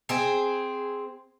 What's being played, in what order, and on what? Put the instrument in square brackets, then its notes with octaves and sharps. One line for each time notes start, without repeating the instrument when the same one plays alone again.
[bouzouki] C4 G#4